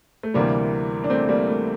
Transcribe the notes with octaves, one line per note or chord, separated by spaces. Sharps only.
A3
D2 C3 E3 G3 A#3
D4
A3 C4
G3 A#3
A3